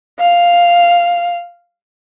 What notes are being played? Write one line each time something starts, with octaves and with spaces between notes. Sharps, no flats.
F5